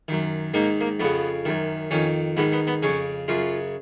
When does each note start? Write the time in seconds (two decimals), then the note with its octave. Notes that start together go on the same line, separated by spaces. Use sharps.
0.08 F#2 D#3
0.54 G#2 D#3 A#3
0.81 A#3
1.00 F2 C#3 B3
1.45 F#2 D#3
1.91 F2 D#3 C#4
2.37 G#2 D#3 B3
2.52 B3
2.67 B3
2.83 F2 C#3 C#4
3.28 F#2 C#3 F4